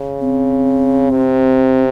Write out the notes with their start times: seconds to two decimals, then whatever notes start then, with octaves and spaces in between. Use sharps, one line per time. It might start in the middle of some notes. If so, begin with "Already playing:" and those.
Already playing: C#3
0.21 C4
1.10 C3